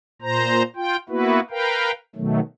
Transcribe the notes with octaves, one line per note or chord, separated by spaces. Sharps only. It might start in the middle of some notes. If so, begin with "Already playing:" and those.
A#2 C5 A#5
F4 G5
A#3 B3 E4 F#4 B4
A#4 B4 F5 G5
B2 D#3 F#3 A3